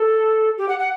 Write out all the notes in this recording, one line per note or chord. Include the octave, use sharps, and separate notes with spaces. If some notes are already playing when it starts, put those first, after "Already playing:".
Already playing: A4
G4
F#5
F#5